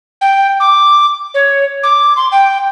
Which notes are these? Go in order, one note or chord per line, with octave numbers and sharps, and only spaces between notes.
G5
D6
C#5
D6
C6
G5